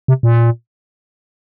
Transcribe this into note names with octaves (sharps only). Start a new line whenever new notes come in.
C3
A#2